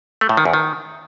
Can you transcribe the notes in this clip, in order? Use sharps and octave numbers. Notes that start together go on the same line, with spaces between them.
A3
A2
D#3
E2
D#3